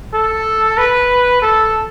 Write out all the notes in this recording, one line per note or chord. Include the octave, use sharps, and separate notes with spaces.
A4
B4
A4